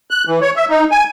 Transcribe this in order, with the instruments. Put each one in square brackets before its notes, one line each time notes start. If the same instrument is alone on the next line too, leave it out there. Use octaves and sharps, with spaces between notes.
[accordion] F#6
E3
C#5
E5
D#4
G#5